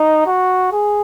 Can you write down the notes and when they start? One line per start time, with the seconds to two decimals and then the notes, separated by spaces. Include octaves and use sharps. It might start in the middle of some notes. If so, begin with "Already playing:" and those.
Already playing: D#4
0.27 F#4
0.72 G#4